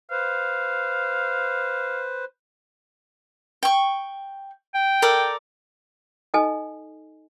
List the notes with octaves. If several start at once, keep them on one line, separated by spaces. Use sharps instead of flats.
B4 C5 F5
G5 C#6
G5
A4 A#4 D5
D#4 A4 D#5 G#5